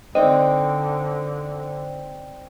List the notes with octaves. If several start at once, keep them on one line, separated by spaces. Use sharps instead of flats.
D3 C4 D#4 C5 D5 D#5